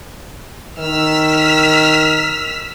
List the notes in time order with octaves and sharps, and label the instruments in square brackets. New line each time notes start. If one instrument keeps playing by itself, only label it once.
[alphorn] D#3 [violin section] E6 F6 B6